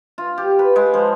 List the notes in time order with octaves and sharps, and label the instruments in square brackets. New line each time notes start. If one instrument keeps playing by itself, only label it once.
[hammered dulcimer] F4
G4
B4
G#3
F3